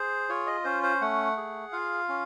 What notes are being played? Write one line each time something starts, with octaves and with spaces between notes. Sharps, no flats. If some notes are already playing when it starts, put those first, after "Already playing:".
Already playing: G#4 C5
F4 C#5
D#5
C#4 C5
C5
A3 F#5
G#4
F4 F5
C#4